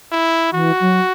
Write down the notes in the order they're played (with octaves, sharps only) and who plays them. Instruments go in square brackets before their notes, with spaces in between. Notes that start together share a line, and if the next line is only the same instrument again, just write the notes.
[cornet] E4
[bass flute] E3 [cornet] F#4
[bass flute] F#3